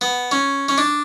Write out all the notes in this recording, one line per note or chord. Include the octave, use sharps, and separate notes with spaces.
B3
C#4
C#4
D4